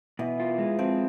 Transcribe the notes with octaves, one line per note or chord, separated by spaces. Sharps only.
B2 E3
F4
G#3
F3 C4